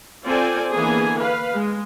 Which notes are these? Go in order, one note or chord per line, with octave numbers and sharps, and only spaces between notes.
C4 F4 A4 C5 D5 G#5
D3 E3 A#3 B3 G#4 G#5
B4 F5
G#3